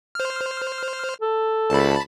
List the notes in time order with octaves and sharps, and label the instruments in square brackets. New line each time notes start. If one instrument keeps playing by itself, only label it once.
[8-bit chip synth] C5 F6
[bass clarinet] A4
[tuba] C#2 [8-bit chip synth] A5 B5